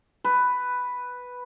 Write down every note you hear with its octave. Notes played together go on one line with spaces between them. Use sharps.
B4